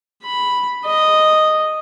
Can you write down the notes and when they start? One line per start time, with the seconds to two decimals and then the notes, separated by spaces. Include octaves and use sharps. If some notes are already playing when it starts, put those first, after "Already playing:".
0.23 B5
0.85 D#5